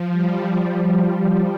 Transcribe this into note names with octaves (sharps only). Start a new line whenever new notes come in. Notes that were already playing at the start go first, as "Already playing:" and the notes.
Already playing: F3
G3
G3